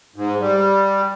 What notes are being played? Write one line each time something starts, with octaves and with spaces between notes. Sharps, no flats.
G#2
G3